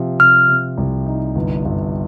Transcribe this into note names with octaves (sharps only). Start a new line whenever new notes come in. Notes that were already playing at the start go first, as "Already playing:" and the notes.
Already playing: C3 F3
C3 F6
C3
C2
D#4
G1
G1